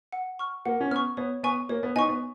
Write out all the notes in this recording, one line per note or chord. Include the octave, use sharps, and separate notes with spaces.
F#5
C#6 F6
A#3 F#5
C#4
B3 C#6 F6
B3 C#5
B3 G#5 C#6
A#3 C#5
B3
B3 D#4 G#5 C#6
B3